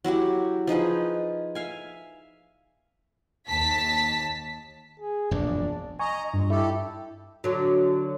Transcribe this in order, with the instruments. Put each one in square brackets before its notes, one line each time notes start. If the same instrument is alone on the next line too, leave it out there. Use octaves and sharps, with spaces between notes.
[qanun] F#3 E4 F#4 G4
F3 D#4 G#4 B4
E5 F5 G#5
[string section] D#2 A5 B6
[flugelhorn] G#4
[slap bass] E1 A#1 F#2 [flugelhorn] D4
[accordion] D#5 A#5 [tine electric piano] G#5 C#6
[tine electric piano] G2 [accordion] A#2
[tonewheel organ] E4 [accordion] G4 A4
[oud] D3 F#3